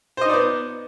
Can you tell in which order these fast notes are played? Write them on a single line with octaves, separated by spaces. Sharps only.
C5 D#5 D#4 D5 B3